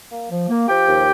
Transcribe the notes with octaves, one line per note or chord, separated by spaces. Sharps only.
A#3
F3
A#3
F3 G4 G5
D#2